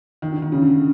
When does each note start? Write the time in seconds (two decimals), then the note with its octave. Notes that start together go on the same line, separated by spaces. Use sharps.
0.22 D#3
0.32 D3
0.42 D#3
0.52 C#3
0.62 D3